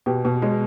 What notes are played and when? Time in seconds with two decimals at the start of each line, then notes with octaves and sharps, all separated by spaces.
0.06 B2 G4
0.25 B2
0.42 G#3